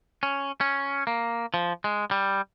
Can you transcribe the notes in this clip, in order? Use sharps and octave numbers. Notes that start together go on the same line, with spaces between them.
C#4
C#4
A#3
F3
G#3
G3